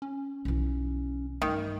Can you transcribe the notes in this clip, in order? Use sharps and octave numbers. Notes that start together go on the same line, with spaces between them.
C#4
B1 E3
G2 D#3 A3